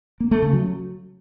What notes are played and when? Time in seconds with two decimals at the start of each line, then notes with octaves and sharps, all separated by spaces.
0.20 A#3
0.31 A3
0.42 C#3
0.53 F#3